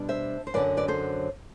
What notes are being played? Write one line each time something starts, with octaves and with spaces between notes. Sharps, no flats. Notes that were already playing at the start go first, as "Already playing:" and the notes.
Already playing: B2 G3 D4
C5 E5
C5
F#2 D3 F#3 B4 D5
B4 D5
A4 C5